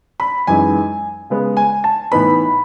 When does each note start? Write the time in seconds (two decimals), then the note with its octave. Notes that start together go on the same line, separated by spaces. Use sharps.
0.20 B5
0.47 F#2 E3 G#3 D#4 G#5
1.30 C#3 G#3 B3
1.57 G#5
1.84 A5
2.12 A2 E3 B3 D#4 B5